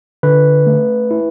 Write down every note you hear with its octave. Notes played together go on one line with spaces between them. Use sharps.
D3 B4
A3
E4